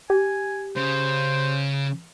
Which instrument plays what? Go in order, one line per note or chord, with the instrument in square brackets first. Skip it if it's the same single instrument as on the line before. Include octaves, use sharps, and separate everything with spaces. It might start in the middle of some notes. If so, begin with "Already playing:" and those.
[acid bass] G4 [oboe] G#5
[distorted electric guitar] C#3 [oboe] C5